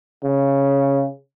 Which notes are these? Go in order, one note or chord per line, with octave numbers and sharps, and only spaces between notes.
C#3